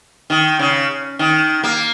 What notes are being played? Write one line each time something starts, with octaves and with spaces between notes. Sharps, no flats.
D#3
C#3
D#3
A#3